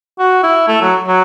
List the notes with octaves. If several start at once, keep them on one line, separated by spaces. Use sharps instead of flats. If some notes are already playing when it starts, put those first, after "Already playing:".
F#4
E4
A3
F#3
F#3